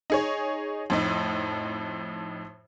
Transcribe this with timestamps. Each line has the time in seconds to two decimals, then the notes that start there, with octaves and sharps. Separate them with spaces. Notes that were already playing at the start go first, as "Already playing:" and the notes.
0.10 D#4 G#4 C#5
0.90 F2 A2 D#4